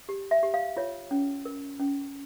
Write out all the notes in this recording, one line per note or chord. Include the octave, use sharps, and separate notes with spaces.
G4
E5
G4
F5
F4 C#5
C#4
A#4
C#4